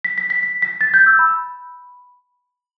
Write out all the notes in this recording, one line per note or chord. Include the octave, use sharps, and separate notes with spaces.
B6
B6
B6
B6
B6
A6
G6
E6
B5